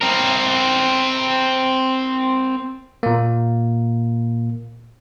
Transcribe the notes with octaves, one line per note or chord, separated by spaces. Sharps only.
C4 A#4
A#2 A#3